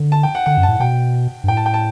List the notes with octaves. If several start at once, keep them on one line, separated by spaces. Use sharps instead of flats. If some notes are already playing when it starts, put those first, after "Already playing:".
Already playing: D3
A5
G5
F#5
D3 F#5
F#2
A5
A2
B2 G5
G2
A2 G5
A5
G5
A5